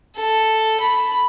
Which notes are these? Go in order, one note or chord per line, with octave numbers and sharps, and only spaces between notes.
A4
B5